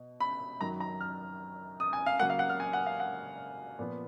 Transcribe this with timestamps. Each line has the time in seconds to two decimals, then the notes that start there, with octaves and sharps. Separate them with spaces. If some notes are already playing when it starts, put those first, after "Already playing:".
Already playing: B2
0.20 B5
0.61 F#2 D#3 F#3 A#5
0.80 A#5
1.00 F6
1.80 D#6
1.93 G#5
2.06 F5
2.19 C#3 F#3 A#3 F#5
2.30 F5
2.39 F#5
2.49 F6
2.60 G#5
2.73 F#5
2.86 F5
3.00 F#5
3.79 A#2 F3 B3